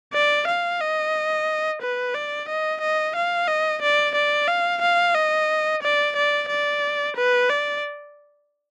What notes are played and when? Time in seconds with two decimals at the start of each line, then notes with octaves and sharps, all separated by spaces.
0.13 D5
0.47 F5
0.81 D#5
1.81 B4
2.14 D5
2.48 D#5
2.81 D#5
3.15 F5
3.48 D#5
3.82 D5
4.15 D5
4.48 F5
4.82 F5
5.15 D#5
5.83 D5
6.16 D5
6.49 D5
7.16 B4
7.49 D5